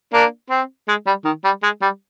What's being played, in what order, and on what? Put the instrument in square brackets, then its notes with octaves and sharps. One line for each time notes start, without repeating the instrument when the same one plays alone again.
[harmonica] A#3 D4
C4
G#3
G3
D#3
G3
G#3
G3